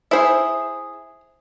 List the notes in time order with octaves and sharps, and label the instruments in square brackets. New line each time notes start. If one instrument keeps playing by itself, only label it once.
[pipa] E4 G#4 [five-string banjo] C5 E5